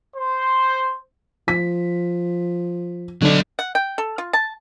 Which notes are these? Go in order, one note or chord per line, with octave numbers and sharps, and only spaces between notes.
C5
F3 B6
D3 F#3 D4 D#5
F#5
G5
A4
F4
A5